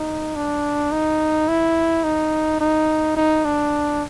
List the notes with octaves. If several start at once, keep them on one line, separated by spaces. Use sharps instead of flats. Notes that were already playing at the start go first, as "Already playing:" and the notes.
Already playing: D#4
D4
D#4
E4
D#4
D#4
D#4
D4